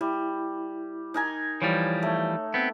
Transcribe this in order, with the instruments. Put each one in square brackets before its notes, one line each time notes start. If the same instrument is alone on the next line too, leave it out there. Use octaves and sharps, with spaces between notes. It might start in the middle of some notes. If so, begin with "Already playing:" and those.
[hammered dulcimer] G3 [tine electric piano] E4
[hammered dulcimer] D#4 A#4 G#5
[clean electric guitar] E3 F3 G3 [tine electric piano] C#5
[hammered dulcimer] A3
[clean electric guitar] B3 C4